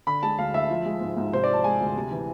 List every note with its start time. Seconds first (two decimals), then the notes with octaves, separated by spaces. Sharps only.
0.07 D3 B5
0.23 G#3 A5
0.38 D2 F5
0.54 D2 E5
0.70 F3
0.86 G#3
1.01 G#2
1.17 G#2
1.33 C3 C5
1.44 D5
1.49 F3 A5
1.64 G#3 G#5
1.80 D2
1.96 C3
2.11 E3